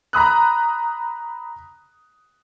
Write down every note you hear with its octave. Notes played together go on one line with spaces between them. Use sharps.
A#5 B5 D#6 F#6